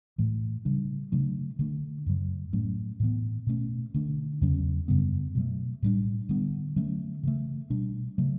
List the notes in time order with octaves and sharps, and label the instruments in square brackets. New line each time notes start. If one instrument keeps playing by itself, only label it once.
[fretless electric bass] A2 E3 A3
C#3 G3 D4
C#3 F#3 A3 D4
D3 A3 D4
F#2 C#3 F#3
A2 F#3 A3 C#4
A2 E3 B3
B2 A3 C#4
D3 A3 D4
E2 C#3 F#3 C#4
F#2 C#3 G3 B3
B2 F#3 A3
A2 G3 D4
D3 G3 B3 D4
D3 F#3 A3 C#4
C#3 E3 A3
B2 G3 D4
C#3 F#3 A3